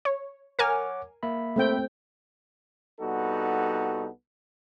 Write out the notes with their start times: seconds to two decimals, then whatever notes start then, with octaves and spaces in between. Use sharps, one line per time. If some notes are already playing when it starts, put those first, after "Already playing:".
0.05 C#5
0.59 A#4 C#5 F#5 G#5 D6 F6
1.23 A#3 E5 B5
1.56 A3 C4 G5
3.00 C2 G3 B3 D#4 F#4 A4